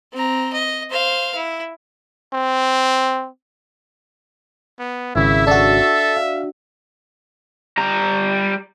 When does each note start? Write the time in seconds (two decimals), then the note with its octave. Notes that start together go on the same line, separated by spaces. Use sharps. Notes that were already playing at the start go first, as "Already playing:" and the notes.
0.13 C4 A#5
0.53 D#5
0.90 C5 F5
1.35 E4
2.33 C4
4.79 B3
5.16 G#1 C#3 E4 E5
5.47 D4 F#4 A4
6.17 F5
7.78 G3 A#5